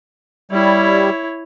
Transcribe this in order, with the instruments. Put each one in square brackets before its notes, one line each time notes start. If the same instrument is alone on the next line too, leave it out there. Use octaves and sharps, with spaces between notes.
[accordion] G3 [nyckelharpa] E4 C#5